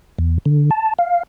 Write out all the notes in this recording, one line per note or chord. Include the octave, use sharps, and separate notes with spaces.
E2
D3
A5
F5